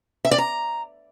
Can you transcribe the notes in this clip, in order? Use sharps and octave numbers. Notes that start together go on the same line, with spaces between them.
E5
D5
A#5